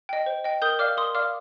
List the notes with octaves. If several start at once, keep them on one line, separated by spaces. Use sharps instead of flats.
D#5 G5
C5
D#5 G5
A#4 D#6 G6
D5 F5 D6 F6
A#4 C6 D#6
D5 F5 D6 F6